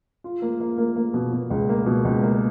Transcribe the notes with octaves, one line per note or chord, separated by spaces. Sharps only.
F4
A#3
A#3
A#3
A#3
B2
B2
C#2
A#3
B2
C#2
A#3